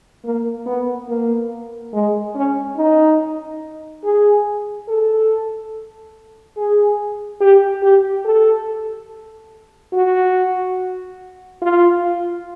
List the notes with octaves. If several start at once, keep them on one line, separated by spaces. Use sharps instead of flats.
A#3
B3
A#3
G#3
C#4
D#4
G#4
A4
G#4
G4
G4
A4
F#4
F4